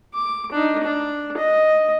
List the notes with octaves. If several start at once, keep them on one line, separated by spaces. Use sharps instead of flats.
D6
D4 D#4
D4
D#5